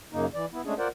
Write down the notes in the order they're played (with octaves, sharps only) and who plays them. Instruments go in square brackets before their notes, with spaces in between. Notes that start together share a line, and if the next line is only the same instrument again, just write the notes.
[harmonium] F#2 C#3 A#3 D#4
E3 D5
B3 E4
G#3 A3 C#4 D4 G#4
F4 A#4 C5 D5 F#5